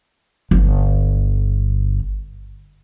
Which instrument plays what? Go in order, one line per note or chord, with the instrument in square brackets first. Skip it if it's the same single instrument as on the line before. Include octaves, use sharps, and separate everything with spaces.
[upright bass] G1 D3